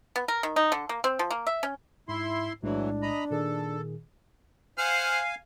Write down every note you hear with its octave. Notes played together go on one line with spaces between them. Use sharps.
B3
A#4
D#3
D#4
D3
A#3
C4
F3
A#3
E5
C#4
G#2 E4 C6
B1 A2 E3 F#3 G#3 D4
D#5 A#5 B5
A#2 D#3 G#4 A4
C5 F5 F#5 G#5 F6